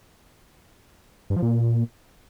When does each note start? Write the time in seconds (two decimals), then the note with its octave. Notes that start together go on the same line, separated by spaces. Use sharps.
1.30 G2
1.36 F3
1.42 A#2